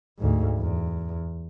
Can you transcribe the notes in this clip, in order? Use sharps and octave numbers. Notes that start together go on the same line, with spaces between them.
D2 G#2
E2